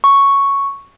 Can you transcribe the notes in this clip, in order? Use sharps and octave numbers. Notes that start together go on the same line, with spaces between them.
C#6